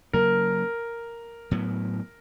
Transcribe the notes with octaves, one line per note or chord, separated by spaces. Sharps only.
C#3 F#3 A#3 A#4
A2 F#3 B3